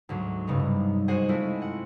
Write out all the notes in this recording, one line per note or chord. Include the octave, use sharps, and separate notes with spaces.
D2 G#2 F#3
F#1 G2 C#3 B3 D#4
C3
F#4 G#4 C5 D#5 F#5 G#5
G#3 A3 C4 E4 F4
F#5